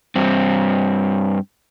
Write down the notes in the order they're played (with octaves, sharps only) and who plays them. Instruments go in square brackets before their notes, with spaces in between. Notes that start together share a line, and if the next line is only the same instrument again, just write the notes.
[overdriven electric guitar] G2 C4